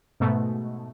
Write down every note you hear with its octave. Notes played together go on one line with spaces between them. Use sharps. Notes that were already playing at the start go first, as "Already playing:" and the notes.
G#2 B2 A3